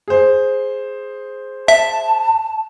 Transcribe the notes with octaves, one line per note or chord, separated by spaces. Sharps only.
G#4 C5
E5 A5